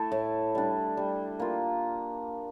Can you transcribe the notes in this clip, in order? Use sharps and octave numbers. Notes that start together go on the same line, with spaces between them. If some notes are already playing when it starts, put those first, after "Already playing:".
Already playing: A3 E4 A4
A2
G3 D4
G3
A#3 F4